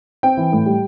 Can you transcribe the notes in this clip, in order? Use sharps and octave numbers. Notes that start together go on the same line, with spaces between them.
C4 G5
E3
A2
G3